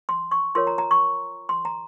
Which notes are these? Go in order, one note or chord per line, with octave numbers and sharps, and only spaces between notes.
C6
C#6
F4 A#4 C#5 C6
A#5
A#5
C#6
C6
A#5